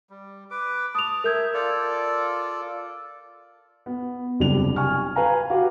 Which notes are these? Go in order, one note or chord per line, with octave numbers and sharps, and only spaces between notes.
G3
B4 D6
A5 D#6 F7
A#4 E5 G6 G#6
F4 A4 D5
B3
F#1 C3 G3 D4 F7
G#5 C#6 F6
B4 F5 G#5 A#5
F#4 G4 F5